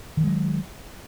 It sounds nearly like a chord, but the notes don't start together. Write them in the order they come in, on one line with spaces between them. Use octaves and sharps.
D#3 E3 G#3 F#3